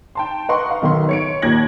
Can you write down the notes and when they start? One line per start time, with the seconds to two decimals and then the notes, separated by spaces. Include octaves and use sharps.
0.15 G5 A5 C6
0.49 B4 D#5 F#5 A#5 C6 C#6
0.70 F5
0.82 B1 D#3 B3 C6
1.09 C#5 C#7 D7
1.42 D#2 A#2 G#6 A#6 F#7